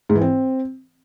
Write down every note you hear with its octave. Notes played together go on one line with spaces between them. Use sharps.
G#2
E3
C4